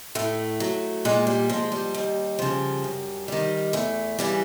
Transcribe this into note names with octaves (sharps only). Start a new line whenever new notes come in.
A2 A3
F#3
A#2 G#3
G3
F3 G#3
G3
D#2
C#3 F3
F#2
D#3 G3
E2 A3
C#3 E3 G3